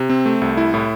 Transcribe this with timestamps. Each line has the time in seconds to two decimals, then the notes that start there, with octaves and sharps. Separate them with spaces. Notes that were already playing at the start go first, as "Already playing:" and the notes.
Already playing: C3
0.10 C4
0.26 A3
0.42 C2
0.57 E4
0.74 A2